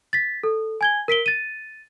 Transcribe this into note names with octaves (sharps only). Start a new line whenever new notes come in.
A6 B6
A4
G#5 G#6 G7
A#4 B6 D7 G7
A6 D#7